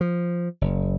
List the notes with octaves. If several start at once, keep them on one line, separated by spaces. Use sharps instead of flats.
F3
F#1